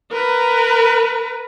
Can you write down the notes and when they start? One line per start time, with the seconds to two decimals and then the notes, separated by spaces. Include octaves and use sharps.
0.12 A#4 B4